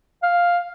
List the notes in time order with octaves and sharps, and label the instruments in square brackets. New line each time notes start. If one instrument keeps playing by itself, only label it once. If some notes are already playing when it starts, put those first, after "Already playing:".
[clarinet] F5